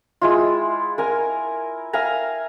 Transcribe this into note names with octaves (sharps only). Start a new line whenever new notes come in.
G#3 E4 F4
A#4 G#5 A#5
E5 F5 G#5 A#5